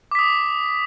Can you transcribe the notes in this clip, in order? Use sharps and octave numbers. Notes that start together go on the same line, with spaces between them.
D6 D#6 B6